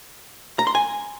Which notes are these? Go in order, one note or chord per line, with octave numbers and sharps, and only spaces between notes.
A#5
C6
G#5